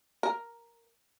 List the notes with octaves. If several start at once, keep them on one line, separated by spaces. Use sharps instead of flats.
A#4